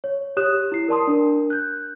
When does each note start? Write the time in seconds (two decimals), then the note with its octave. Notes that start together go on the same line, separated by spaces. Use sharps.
0.04 C#5
0.37 G4 C#5 D#6 F#6 E7
0.72 E4 C7
0.88 A#4 D5 A5 C6 D#6
1.07 D4 A#4
1.50 F#6 G6